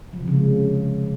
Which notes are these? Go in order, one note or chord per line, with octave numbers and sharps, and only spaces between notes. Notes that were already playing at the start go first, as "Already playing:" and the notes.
F3
C3
C#3
G#3